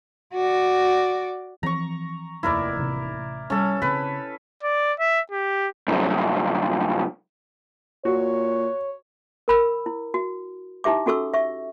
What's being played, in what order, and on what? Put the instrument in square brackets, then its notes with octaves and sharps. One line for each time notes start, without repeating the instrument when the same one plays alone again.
[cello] F#4 D5
[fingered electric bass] E3 F3 C4 [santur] A#5 C#6
[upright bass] F1 D#2 [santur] E4 A#4 D5
[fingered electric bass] A1 C3
[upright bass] G3 [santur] C#4 A4
[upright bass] C#3 C4 [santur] B4
[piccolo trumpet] D5
E5
G4
[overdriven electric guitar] C2 F#2
[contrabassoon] A#2 [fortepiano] F#4 [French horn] C#5
[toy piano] A#4 B5 E6
E4
F#4
D#4 E4 G4 E5 D6
C#4 F#4 A4 C#6 E6
E5 C#6